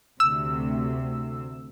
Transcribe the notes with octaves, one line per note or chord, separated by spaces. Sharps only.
D2 C3 E6